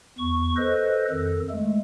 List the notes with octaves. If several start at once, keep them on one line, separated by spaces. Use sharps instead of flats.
E2 C#6
A4 B4 C5 D#5
F2 D#3 A4
G#3 A3